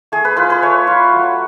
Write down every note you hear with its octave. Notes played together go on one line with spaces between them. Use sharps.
A3 G#4
B4
F4 B4
B4
A3 C#5
F4
F#3